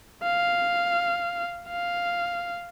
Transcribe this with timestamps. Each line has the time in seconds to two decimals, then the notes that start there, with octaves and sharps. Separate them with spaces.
0.24 F5
1.69 F5